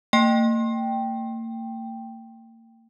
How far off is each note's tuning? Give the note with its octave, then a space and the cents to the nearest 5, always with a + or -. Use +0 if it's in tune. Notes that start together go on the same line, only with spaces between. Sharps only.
A#3 -40 G5 +0